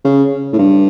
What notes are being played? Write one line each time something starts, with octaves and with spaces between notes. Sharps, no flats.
C#3
A2
G2